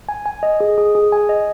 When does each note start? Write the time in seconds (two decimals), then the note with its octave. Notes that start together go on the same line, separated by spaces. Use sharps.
0.09 G#5
0.26 G#5
0.43 D#5
0.60 G#4
0.78 G#4
0.95 G#4
1.12 G#5
1.29 D#5